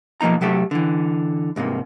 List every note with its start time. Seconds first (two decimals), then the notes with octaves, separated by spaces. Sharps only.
0.21 B1 F3 A#3 D#4 A#5
0.41 C3 F#3 A3 G4 A4
0.71 D3 E3
1.56 C2 G#2 C3 A#3